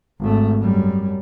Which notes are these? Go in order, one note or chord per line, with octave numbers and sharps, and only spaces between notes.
G#1 A3
F#2 G3